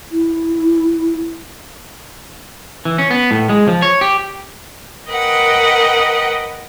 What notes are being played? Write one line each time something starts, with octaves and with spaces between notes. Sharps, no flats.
E4
E3
C#4
B3
A2
G#3
F3
C#5
G4
A#4 B4 D#5 F#5 G5